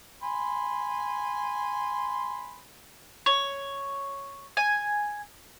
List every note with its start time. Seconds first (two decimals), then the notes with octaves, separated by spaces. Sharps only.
0.23 G#5 B5 C6
3.26 C#5
4.57 G#5